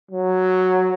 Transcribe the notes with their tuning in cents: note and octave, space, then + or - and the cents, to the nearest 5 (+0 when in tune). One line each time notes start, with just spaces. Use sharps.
F#3 +0